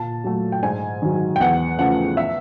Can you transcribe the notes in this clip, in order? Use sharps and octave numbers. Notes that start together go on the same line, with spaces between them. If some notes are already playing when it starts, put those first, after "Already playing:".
Already playing: A#2 A5
F#3 A3
G5
G#2 G#5
D#3 F#3
G5
E2 F#5
C#3 F3 A3 F#5
E5